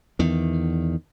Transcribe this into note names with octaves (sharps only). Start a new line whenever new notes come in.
E2 D#3